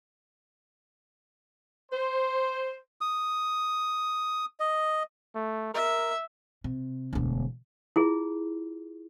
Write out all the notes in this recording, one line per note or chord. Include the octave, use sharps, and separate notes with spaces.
C5
D#6
D#5
A3
A#4 E5
C3
E1 D2
E4 F4 G#4